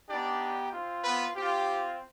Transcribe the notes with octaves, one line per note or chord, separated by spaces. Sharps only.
B3 D4 D#4 G4 D5
C4 F4
B3 B4
C4 F4 G4